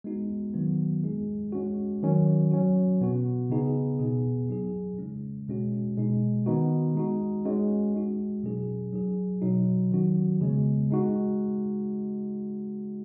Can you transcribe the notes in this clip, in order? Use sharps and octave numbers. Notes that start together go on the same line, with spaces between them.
G#3 B3 D#4 F#4
D#3 F#3 B3 F#4
G#3 D#4 G#4
G#3 C#4 F#4
D#3 F#3 C#4 F#4
F#3 C#4 F#4
B2 B3 F#4
C#3 B3 D#4 G#4
B2 B3 G#4
F#3 D#4 G#4
C#3 G#3 C#4
B2 G#3 C#4 F#4
B2 G#3 D#4
D#3 B3 D#4 F#4
G#3 D#4 F#4
G#3 C#4 F#4
G#3 D#4 F#4
B2 F#3 C#4 G#4
F#3 D#4 G#4
B2 F#3 D#4 F#4
D#3 F#3 C#4 F#4
C#3 G#3 B3
G#3 D#4 F#4